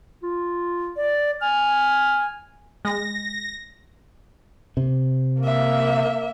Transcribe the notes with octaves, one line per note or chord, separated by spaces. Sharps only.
F4
D5
G#5 F6
G#3 A#6
C3
A#3 E5